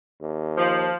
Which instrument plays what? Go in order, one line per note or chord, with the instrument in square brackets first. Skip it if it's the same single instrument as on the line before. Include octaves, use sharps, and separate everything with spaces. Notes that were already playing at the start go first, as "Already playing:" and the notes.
[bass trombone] D#2
[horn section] F3